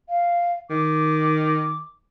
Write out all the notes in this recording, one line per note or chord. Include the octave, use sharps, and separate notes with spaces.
F5
D#3 D6